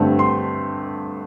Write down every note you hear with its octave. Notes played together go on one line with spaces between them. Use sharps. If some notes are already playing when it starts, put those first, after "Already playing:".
Already playing: G2 D3 A3 C4
C6